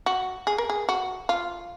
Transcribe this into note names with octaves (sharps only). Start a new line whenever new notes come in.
F#4
G#4
A#4
G#4
F#4
F4